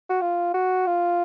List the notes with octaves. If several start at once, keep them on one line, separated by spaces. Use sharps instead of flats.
F#4
F4
F#4
F4